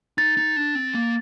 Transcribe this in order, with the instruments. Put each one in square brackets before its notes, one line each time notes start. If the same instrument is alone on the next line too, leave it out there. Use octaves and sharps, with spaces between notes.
[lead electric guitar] D#4 [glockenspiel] A6
[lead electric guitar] D#4
D4
C4
A#3